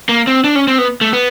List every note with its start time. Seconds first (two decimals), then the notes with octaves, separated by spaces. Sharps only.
0.09 A#3
0.27 C4
0.44 D4
0.55 C#4
0.68 C4
0.78 B3
1.01 A3
1.13 B3